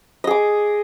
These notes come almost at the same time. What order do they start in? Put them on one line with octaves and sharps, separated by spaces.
D#5 G#4 D6